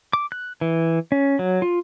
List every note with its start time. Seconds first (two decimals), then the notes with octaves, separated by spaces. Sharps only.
0.13 D6
0.32 F#6
0.61 E3
1.12 C#4
1.39 F#3
1.62 F4